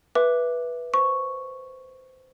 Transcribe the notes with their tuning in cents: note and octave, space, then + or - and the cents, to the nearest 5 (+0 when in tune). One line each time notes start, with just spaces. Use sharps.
B4 -10 E5 +0 D6 +0
C5 -15 C#6 +0